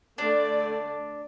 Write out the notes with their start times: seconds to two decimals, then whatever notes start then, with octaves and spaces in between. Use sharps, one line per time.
0.18 D3 A3 D4 D5